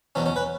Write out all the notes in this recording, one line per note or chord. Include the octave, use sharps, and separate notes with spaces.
E2 B2 F#3 C#4
C#4
B4